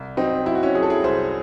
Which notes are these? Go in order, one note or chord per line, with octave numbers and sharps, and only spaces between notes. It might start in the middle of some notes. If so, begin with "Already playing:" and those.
Already playing: C2
F#3 C4 D#4
F#3 E4
F#4
C#4 E4
F#3 G#4
A4
E4 G#4
C2 G#4 C5